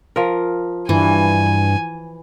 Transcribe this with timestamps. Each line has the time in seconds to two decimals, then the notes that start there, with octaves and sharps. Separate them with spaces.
0.16 F3 A#4
0.89 G2 E3 G#5